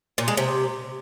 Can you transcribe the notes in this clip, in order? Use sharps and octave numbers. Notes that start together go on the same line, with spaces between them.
A#2
G#3
C3